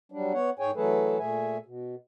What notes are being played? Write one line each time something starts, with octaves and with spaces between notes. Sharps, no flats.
F#3 G3 D4
B3 C#5 F#5
G#2 G#4 C#5 G5 G#5
E3 F#3 A3 G#4 A4 B4
A#2 A3 G#4 E5 G#5
B2